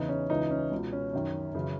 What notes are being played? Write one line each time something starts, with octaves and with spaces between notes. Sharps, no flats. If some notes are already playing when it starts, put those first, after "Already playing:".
Already playing: E2 C#3 E3 D#4
C#4
C#2 C#3 E3 D#4
C#4
C#2 B2
C#4
F#2 D#3
F#2 C#3 E3